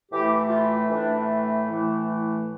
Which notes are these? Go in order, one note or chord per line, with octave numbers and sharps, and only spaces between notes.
A2 E3 A3 G4
F4
A2 E3 A3 D4
A2 E3 A3 E4